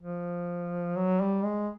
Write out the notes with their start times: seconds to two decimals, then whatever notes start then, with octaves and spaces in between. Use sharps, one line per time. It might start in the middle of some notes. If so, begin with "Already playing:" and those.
0.02 F3
0.97 F#3
1.21 G3
1.44 G#3